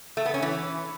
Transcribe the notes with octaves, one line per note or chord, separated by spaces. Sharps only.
A3
B3
C#4
E3